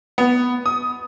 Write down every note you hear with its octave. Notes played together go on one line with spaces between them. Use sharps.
B3
D#6